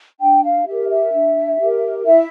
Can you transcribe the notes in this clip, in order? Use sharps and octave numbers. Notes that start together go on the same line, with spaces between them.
D4 G5
F5
G4 A#4 E5
E5
D4
G4 A#4
E4 E5